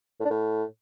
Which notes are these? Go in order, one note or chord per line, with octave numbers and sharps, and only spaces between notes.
A2
D4
A2